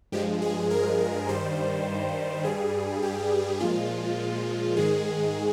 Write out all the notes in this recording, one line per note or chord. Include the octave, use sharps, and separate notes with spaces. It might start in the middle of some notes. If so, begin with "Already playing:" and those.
G2 F3 G#3 G4
G#4
A#4
G2 D#3 G3 C5
G2 G3 G#4
G4
A#2 F3 G#3 F4
G#2 D#3 G#3 G#4